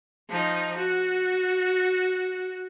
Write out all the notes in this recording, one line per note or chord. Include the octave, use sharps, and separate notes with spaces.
F3 D#4
F#4